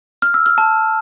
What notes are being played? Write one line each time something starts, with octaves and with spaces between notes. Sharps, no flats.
F6
E6
F6
A5